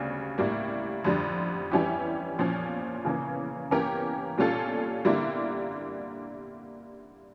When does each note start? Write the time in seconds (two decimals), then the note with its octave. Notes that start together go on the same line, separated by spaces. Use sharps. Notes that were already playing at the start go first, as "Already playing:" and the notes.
Already playing: D2 C#3 G3 D4
0.38 A2 G3 A#3
1.04 F2 D3 G3
1.71 E3 G3 C#4 E4 G4
2.38 A#2 F3 C#4
3.05 C#3 E3 A#3 C#4
3.71 E3 A#3 C#4 G4 A#4
4.37 A#2 G3 C#4 F4 A4
5.05 D3 G3 A#3 E4